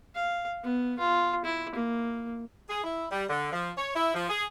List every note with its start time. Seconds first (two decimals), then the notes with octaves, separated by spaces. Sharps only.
0.15 F5
0.64 B3
0.99 F4
1.45 E4
1.75 A#3
2.68 G#4
2.84 E4
3.11 G3
3.29 D3
3.52 F3
3.77 C#5
3.95 E4
4.14 F3
4.29 G#4